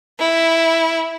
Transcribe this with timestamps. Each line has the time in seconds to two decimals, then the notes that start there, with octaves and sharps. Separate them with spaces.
0.20 E4